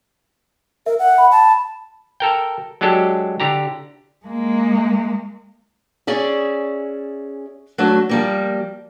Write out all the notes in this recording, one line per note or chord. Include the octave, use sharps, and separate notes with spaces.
A#4 E5
F#5
B5
A5
A4 A#4 G5
F#3 G#3 D4 G4 A4
D3 G4 A#5
G#3 A#3
C#4 G#4 D5 E5
F#3 A3 D4
F3 G3 A#3